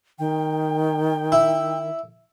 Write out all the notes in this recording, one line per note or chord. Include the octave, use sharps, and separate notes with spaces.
D#3 G5
E4